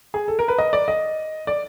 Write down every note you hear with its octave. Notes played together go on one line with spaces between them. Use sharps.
G#4
A4
A#4
B4
D#5
D5
D#5
D5